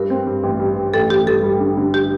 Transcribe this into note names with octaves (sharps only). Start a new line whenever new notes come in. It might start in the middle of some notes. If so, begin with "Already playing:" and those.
Already playing: G2 A#4
C4
G2
A1
G2
G2
A1 A4
A1 G4
G2 A4
G3
D3
D3
G4